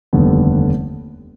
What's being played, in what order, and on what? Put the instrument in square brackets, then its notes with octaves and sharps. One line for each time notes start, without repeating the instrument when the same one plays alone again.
[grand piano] F1 D#2 D3 G3 B3